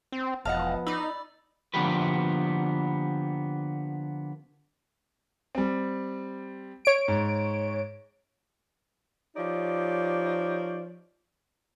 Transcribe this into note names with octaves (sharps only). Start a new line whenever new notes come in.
C4
E1 F3 B3 D#5 F5 F#5 A5
D#4 D5 B5 E6
D3 F3 A#3 B3 G4 B4
G3 C4
C#5 D7
G#2
F3 D#4 G4 C#5 D5